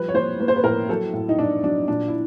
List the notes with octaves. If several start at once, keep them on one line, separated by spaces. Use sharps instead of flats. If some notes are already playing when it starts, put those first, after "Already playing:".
Already playing: F3 G3 B4
C#5
A#3 C5
A#3 B4
C5
B4
A2 A#4
F#3 A4
A2
D#4
A2 D4
F#3 D4
A#2 D4
E4